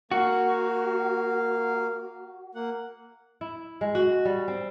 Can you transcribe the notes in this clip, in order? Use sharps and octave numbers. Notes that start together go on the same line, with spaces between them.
A#3 F#4 F5
A#3 F#5
E4
G#3
F#4
G3
C4